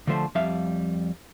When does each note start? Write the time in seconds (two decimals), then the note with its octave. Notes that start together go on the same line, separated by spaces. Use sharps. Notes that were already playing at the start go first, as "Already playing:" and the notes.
0.07 D3 F3 A3 C5
0.35 F2 G3 E5 F5